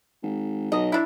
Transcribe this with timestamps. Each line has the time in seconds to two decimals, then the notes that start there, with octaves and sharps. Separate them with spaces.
0.23 G#1
0.72 B1 D#5
0.92 D4 E4